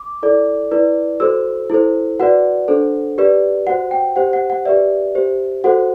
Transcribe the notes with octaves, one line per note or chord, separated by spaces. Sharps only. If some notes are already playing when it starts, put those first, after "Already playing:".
Already playing: D6
E4 A4 D5
E4 B4 D5
F#4 A4 C5 E6
E4 A4 C5
F#4 B4 D5 F#5
D4 A4 C5
G4 B4 D5
F#4 C5 F#5
G5
G4 C5 F#5
F#5
F#5
G4 B4 D5 E5
G4 C5
F#4 A4 C5 F#5